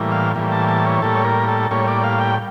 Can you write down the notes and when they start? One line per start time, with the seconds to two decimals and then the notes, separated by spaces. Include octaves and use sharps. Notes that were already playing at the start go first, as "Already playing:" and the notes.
Already playing: A2 E3 G3 A#3
0.12 F5
0.35 A2 E3 G3 A#3
0.52 A5
0.68 A5
0.86 C#5
1.02 A2 G3 A#3 A4
1.15 C#5
1.25 A#4
1.48 A4
1.71 A2 G3 A#3 C#5
1.88 D5
2.04 F5
2.21 G5